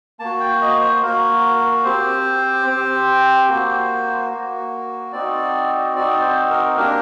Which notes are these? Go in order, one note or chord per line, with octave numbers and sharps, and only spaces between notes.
A#3 A5
F#4
G5
D#5
C5
A#3 F#4 A#4
C4 G4 C5
C4 G4
A#3 F#4
A#3 F#4
C4 D#4 F#4 D5
C4 D#4 F#4 D5
C5
A#4
A#3 D4 G4 A#4